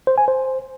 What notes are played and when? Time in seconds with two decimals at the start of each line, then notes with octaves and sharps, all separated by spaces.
0.07 C5
0.18 G#5
0.28 C5